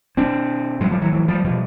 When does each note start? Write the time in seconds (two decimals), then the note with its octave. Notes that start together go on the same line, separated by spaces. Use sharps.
0.17 B2 C4 D4
0.80 A2 F#3 G#3
0.91 F3 G3
1.01 E3 F#3
1.13 E3 F#3
1.28 F3 G3
1.44 B2 F3 G3